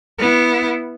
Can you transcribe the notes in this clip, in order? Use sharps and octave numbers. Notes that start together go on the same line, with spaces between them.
B3 E4